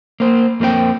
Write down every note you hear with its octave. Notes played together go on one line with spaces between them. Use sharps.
A#3 C5
F2 A#3 C4 D4 G5